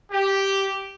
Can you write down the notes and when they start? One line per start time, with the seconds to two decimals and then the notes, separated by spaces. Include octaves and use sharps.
0.12 G4